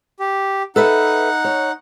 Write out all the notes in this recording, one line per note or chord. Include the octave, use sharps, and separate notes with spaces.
G4
D#4 A4 B4 E5 F#5
C#5